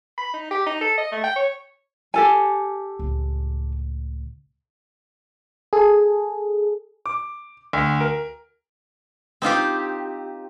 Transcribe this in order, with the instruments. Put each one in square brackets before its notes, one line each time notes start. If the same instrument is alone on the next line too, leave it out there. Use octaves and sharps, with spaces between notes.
[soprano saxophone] B5
D#4
G4
D#4
A4
D#5
A3
G5
C#5
[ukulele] G4 A4 G#5
[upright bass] C#2 A2
[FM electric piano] G#4 A4
[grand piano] D6
D2
A#4
[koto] C4 D#4 F4 G4